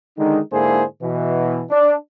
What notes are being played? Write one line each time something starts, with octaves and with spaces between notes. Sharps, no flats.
D3 D#3 G#3 D#4
G#2 D3 A#3 E4 G#4 C5
B2 E3
D4